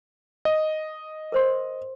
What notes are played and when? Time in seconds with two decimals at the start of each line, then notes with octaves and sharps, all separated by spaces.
0.45 D#5
1.32 A#4 C5 C6